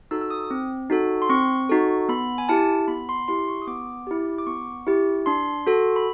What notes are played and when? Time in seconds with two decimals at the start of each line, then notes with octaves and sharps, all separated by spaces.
0.11 D#4 F#4 A4 E6
0.21 E6
0.30 D#6
0.51 C4
0.90 D#4 F#4 A4
1.22 C6
1.29 C4 C#6
1.69 D#4 F#4 A4
2.09 B3 B5
2.38 G#5
2.49 E4 G4 A5
2.88 B3 B5
3.09 C6
3.28 E4 G4 C6
3.48 C#6
3.62 D#6
3.67 B3 D6
4.07 E4 G4
4.38 D6
4.47 B3 C#6
4.87 E4 G4
5.26 D4 C6
5.67 F#4 A4
5.96 B5